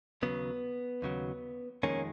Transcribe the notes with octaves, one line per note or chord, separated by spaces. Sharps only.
D#2 C#3 F#3 B3
D#2 C#3 F#3
F2 D#3 G#3 A#3 C#4